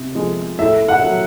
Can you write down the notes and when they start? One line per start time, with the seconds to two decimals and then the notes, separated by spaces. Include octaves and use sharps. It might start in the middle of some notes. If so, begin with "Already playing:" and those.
Already playing: C3
0.15 F3 G#3
0.58 A2 E5
0.88 F#5
1.03 F#3